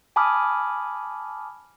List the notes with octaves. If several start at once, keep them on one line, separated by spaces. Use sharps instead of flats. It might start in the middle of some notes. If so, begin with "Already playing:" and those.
G#5 A5 B5 D6 D#6 F6